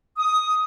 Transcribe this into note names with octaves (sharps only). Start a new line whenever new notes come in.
D#6